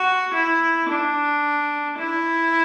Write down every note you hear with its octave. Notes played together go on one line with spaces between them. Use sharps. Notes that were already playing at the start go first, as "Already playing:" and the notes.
Already playing: F#4
E4
D4
E4